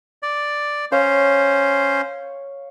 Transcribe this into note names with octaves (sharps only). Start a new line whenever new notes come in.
D5
C#4 C5 C#5 F5